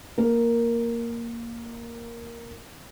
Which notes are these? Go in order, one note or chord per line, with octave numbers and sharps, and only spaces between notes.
A#3 A#4